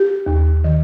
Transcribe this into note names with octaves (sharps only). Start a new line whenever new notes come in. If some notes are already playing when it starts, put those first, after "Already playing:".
Already playing: G4
D#2
D#3